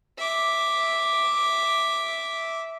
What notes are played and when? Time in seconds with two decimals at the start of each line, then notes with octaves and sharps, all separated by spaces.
0.18 E5 D6